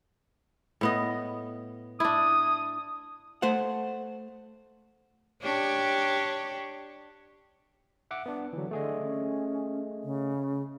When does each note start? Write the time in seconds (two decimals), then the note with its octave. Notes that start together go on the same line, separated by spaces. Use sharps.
0.81 A2 B3 D#5
2.00 D4 E4 D#6
3.42 A3 C5 F#5
5.42 D4 G4 C#5
8.11 E5 F#5 D6
8.26 B3 D4
8.53 D3 E3 F#3
8.71 D3 A3 G#4 D#5
9.03 C#4
10.04 C#3